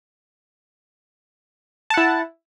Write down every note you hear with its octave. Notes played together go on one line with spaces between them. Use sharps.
E4 F#5 A5